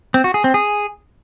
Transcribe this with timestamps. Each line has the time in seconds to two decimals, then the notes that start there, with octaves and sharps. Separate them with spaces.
0.14 C4
0.24 F#4
0.34 G#4
0.44 C4
0.54 G#4